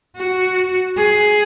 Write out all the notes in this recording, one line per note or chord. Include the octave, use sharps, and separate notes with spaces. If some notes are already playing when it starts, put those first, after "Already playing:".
F#4
G#4